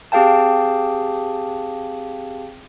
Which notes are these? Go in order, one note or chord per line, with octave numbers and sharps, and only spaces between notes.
C4 G4 G#4 F5 G5 A5